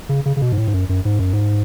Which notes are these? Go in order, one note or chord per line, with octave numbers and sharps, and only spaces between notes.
C#3
C#3
C#3
B2
G#2
A2
G#2
F#2
F#2
G#2
F#2
G#2